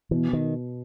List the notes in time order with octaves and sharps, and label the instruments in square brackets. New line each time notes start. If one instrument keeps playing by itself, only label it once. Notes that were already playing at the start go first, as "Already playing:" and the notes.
[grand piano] B2 [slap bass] E3
[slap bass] D#3